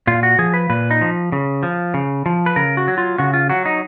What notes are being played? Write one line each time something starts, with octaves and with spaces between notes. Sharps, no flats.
A#2 F4
F#4
F3 G#4
B4
A#2 B4
D#4
F3
C#3
F3
C#3
F3
B4
C#3 A#4
F#4
F#3
F4
C#3 F#4
F4
F#3 F#4
D#4